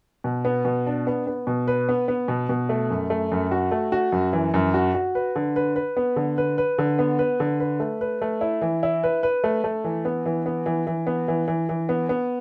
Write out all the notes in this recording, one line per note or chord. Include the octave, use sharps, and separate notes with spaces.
B2
B3
B2
D4
B3
B3
B2
B4
B3
B3
B2
B2
A3
F#2
A3
F#2
F#4
A3
F#4
F#2
E3
F#2
F#4
F#4
B4
D3
B4
B4
B3
D3
B4
B4
D3
B3
B4
D3
B4
A3
B4
A3
E4
E3
E4
B4
B4
A3
A3
E3
B3
E3
B3
E3
E3
B3
E3
E3
E3
B3
B3